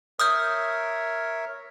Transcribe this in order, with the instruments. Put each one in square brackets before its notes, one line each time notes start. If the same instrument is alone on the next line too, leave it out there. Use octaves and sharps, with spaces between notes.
[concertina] A#4 C#5 E5 [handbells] D#6 F6 G6